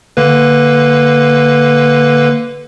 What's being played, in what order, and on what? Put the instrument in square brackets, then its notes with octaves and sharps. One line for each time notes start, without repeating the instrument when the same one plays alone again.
[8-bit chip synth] D3 A#3 B4